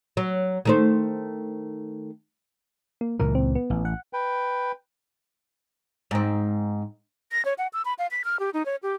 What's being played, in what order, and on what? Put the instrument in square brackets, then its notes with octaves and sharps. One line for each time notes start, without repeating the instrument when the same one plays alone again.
[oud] F#3
D#3 A3 C5
[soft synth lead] A#3
[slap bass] C#2 A#2 E3 [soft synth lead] A#4
[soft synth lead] C4
B3
[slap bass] A1
[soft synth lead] F#5
[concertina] B4 G5
[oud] G#2 C4
[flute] A#6
C#5
F#5
E6
B5
F5
B6
F6
G4
D#4
C#5
G4